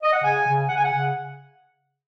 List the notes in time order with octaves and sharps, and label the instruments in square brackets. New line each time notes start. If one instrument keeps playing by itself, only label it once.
[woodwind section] D#5
F#5
C#3 G#5
C#3
C#3 F#5
G#5
F#5
C#3